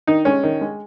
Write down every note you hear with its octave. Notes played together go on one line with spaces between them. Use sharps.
D#3 D#4
G#3 C#4
D#3
G#3